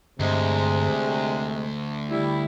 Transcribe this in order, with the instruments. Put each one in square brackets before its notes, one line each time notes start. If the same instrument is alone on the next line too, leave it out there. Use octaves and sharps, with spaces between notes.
[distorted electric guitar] D2 [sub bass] G2 [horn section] C3 G#3
[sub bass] D3
[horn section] G3 E4